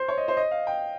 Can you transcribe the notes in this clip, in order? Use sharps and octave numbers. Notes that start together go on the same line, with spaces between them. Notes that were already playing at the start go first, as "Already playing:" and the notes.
Already playing: C5
C#5
D#5
C5
D#5
F5
G5